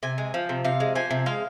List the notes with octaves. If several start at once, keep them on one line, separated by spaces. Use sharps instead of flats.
C3 G#5
G#3
F3
C3
C3 F5
G#3
F3 G#5
C3
G#3 F5